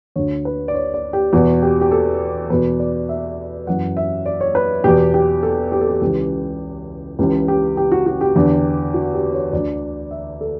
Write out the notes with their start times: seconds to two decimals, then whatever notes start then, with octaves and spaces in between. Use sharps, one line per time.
0.16 D2 D3 C#5
0.45 B4
0.68 D5
0.74 C#5
0.94 D5
1.13 G4
1.33 E2 B2 F#4
1.62 G4
1.81 G4
1.92 A4
2.50 E2 B2 B4
2.80 D5
3.09 E5
3.67 F#2 E3 F#5
3.97 E5
4.26 D5
4.41 C#5
4.55 B4
4.84 E2 B2 G4
5.14 G4
5.43 A4
5.72 G4
5.81 A4
5.89 G4
6.02 C#2 C#3 E3 G4
7.19 C#2 C#3 E3 G4
7.48 G4
7.77 G4
7.92 F#4
8.06 F#4
8.21 G4
8.36 E2 D3
8.94 F#4
9.14 G4
9.33 C#5
9.53 D2 D3 D5
10.11 E5
10.41 A4